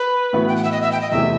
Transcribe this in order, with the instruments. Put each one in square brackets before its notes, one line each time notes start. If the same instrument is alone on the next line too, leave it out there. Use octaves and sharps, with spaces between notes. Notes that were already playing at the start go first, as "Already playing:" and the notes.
Already playing: [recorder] B4
[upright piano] A2 E3 B3 F#4
[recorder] G5
F#5
E5
D#5
E5
G5
D#5
[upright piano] E2 C3 E3 A3 E4 [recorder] E5